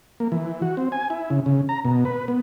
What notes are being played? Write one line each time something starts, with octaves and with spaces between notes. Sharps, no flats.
A#3
E3
F#4
C4
G#5
E4
C#3
C#3
A#5
B2
B4
B3